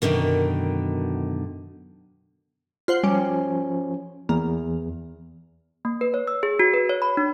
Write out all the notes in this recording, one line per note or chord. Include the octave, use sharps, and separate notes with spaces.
F#2 B2 D3 D#3
F4 C5 F#5
F3 G3 C#4
E2 A#3
A#3
B4
C#5
E6
G#4
F#4
B4
C#5
B5
D4